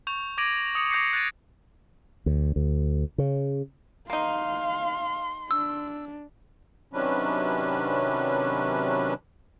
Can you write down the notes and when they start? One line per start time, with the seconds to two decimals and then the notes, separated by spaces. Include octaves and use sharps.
0.07 C#6 G6 F7
0.38 D6 G#6 A#6 D7 D#7 F#7
0.75 D#6 C#7 F7
0.91 D6 G6 A#6 C7 C#7
1.13 F#6 G#6 A6 D7 D#7
2.26 D2
2.56 D2
3.18 C#3
4.10 A#3 D#4 F5 C6
5.51 D4 E6
6.93 C3 D#3 F#3 C#4 D4 B4